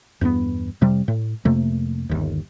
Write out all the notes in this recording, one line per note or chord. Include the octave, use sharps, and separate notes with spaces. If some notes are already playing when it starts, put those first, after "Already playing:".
E2 G2 A#3 B3
F2 C3 G3
A2
F2 C3 A3 A#3
G1 D#2